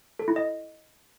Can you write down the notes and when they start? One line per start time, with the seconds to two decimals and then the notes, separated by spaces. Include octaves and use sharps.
0.19 A4
0.28 E4
0.36 D#5